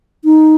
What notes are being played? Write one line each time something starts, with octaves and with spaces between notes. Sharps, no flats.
D#4